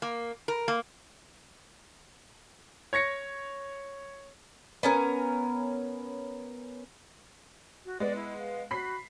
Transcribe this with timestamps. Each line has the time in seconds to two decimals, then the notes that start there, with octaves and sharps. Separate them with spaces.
0.02 A#3
0.48 A#4
0.68 A#3
2.93 C#5 G#6 A#6 C#7
4.83 B3 C#4 A#4
7.85 F#4
8.00 G#3 B3 D5
8.16 E4
8.38 F5
8.71 F#4 B5 B6 C7